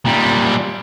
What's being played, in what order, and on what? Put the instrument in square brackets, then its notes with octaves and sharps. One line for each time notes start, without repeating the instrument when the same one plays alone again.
[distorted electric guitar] A#2 G3